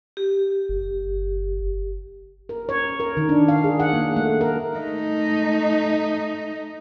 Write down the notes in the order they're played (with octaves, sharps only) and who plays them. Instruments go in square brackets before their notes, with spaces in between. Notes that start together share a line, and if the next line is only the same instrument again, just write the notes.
[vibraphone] G4
[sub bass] F#1
[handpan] A#4
C#5
A#4
D#3
D4
F5
G#4
F#5
A#3
A3
A#4
[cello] A3 D#4